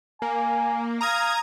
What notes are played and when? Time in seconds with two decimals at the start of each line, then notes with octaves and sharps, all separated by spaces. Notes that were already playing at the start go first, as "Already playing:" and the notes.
0.22 A#3 G#5
1.01 F5 A#5 D#6 G#6